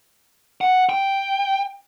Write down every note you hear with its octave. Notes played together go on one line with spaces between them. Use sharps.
F#5
G5